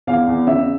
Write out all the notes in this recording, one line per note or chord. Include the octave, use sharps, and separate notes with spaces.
E2 F5
E2
C#3 E5